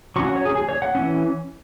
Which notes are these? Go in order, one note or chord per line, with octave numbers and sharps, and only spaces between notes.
F#3 C#4 C#6
F#5
C#5
G#4
G#4
C#5
F#5
E3 C#4